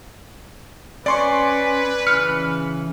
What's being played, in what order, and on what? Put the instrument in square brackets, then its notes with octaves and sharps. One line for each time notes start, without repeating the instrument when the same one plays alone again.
[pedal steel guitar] C#4 [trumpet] B4 [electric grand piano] D5 C6 C#6
[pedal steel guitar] C#3 E3 F6 [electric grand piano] C#7